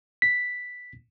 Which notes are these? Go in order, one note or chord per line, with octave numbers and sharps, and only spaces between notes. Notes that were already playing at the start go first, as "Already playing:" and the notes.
B6